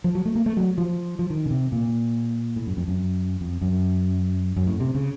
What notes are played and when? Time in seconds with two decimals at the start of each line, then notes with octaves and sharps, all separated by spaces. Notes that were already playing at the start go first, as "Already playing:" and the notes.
0.04 F3
0.15 F#3
0.25 A3
0.35 A#3
0.46 A3
0.57 F#3
0.78 F3
1.19 F3
1.30 D#3
1.46 C#3
1.51 C3
1.72 A#2
2.56 A2
2.67 F#2
2.77 F2
2.88 F#2
3.41 F2
3.61 F#2
4.57 F#2
4.67 A2
4.80 C3
4.95 C#3